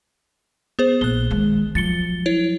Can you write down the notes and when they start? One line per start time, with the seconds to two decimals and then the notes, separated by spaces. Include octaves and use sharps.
0.79 B3 G#4 C5
1.01 A#1 F#6 G7
1.31 D#3 G#3
1.75 F3 F#3 A6 C#7 G7
2.26 E4 C#5